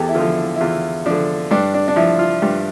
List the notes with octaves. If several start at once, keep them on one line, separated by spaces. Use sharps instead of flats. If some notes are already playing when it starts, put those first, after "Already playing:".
Already playing: E2 G4 A4
E4
D3 F3 F4
E4
E4
E2 F4
D3 F3 D4
G2 D4
D4
D4
F3 E4
F4
G2 G4